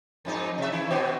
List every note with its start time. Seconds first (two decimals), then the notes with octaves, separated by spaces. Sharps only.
0.25 F2 G#2 D#4
0.58 C3 E5
0.72 D#3 E4
0.90 B2 B3 F#4